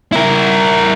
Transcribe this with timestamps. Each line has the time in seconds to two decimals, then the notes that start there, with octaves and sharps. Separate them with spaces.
0.13 E4 A#4